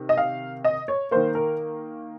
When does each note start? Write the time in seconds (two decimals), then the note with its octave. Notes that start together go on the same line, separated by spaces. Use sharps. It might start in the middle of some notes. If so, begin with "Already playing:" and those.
Already playing: C3 D#3
0.09 D#5
0.17 F5
0.64 D#5
0.88 C#5
1.11 D#3 A#3 C5
1.35 A#4